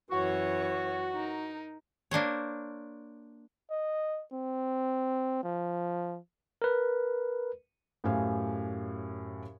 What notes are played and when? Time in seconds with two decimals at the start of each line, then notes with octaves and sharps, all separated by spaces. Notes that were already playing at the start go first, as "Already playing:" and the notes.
0.11 F#2 E3 F#4 C#5
1.13 D#4 A#4
2.11 A#3 D4 C5 C#5
3.70 D#5
4.33 C4
5.43 F3
6.62 A#4 B4
8.04 F#2 A2 G4 C5 F5 G#5